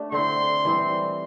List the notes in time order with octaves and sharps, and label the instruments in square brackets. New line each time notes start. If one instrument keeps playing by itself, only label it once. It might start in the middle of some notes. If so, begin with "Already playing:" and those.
Already playing: [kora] A3 D4 G4
[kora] D3 C4 E4 [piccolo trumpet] C6
[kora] E3 G3 C4